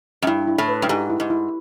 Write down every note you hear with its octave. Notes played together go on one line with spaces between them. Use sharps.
F#2
G2 E4
E4
A2
B4
G2
G#2 G4
E4
G#2
E4